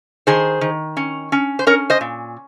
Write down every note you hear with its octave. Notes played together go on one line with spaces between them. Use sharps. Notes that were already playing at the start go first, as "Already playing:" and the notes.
D#3 G#4 C5
D#3
C#4
C#4
C5
C#4 A#4 C#5
C5 D#5
A#2